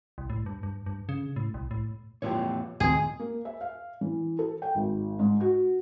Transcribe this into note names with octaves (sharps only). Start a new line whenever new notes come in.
C2
A2
G2
G2
G2
C#3
A2
C2
A2
F2 A#2 E3 F4 G4 C#5
D1 B1 D#3 F3 C4 G#4
A#3
E5
F5
E3
A4
G5
G#1
G#2
F#4